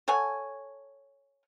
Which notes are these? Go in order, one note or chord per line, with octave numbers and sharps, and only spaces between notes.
A4 C#5 F#5 G#5